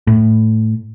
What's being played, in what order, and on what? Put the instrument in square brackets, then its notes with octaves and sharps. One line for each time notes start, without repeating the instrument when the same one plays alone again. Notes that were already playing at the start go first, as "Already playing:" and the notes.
[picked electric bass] A2